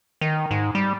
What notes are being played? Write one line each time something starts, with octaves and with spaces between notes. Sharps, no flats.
D#3
G#2
G3